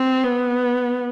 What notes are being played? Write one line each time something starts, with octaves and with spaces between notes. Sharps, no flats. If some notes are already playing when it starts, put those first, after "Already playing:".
Already playing: C4
B3